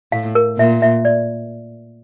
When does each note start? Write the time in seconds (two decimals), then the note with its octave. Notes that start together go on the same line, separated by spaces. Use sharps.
0.12 A2 F5
0.35 A#4
0.58 A#2 E5
0.82 E5
1.05 D5